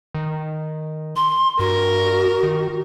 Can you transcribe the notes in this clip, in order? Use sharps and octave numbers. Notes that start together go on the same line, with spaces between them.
D#3
C6
G2 F#4 A#4
D#3